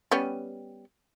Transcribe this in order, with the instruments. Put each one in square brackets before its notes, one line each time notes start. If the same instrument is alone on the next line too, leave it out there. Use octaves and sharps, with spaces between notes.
[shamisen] G3 B3 C#4